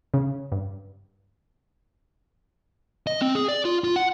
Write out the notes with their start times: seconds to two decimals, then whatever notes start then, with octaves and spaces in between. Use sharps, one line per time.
0.14 C#3
0.52 G2
3.07 D#5
3.22 C4
3.35 G#4
3.48 D5
3.65 F4
3.84 F4
3.96 F#5